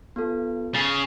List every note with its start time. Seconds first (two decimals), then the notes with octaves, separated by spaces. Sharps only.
0.16 B3 F4 A4
0.74 C#3 A6 B6 C7